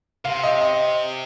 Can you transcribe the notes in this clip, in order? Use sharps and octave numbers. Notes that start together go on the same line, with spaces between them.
C3 F5
D#5
D#5